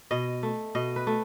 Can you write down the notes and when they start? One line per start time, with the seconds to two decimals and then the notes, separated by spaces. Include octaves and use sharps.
0.11 B2 D#5
0.43 A3
0.75 B2 D#5
0.96 B4
1.07 A3